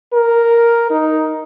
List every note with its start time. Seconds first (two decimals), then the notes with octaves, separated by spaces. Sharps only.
0.13 A#4
0.91 D#4